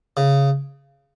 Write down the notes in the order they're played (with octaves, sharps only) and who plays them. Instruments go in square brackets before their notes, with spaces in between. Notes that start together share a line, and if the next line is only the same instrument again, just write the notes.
[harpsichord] C#3